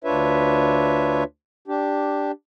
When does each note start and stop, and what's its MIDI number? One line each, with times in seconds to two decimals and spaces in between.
0.04 1.24 38
0.04 1.24 62
0.04 1.24 65
0.04 1.24 71
0.04 1.24 73
0.04 1.24 76
1.68 2.31 62
1.68 2.31 67